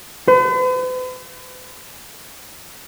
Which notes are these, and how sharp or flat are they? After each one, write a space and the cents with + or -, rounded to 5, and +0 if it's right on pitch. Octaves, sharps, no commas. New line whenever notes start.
B4 +45